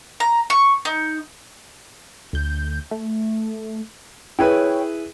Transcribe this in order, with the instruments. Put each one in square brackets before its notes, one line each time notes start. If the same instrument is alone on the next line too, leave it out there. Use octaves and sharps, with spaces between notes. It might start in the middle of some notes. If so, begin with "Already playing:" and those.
[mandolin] A#5
C#6
D#4
[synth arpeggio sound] D2 G6
A3
[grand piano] E4 G#4 B4 [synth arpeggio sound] C#5 G5